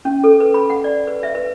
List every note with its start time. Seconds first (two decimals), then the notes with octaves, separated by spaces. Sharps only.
0.05 C#4
0.24 A4
0.40 B4
0.54 B5
0.70 F#5
0.84 D5
1.07 B4
1.23 E5
1.35 B4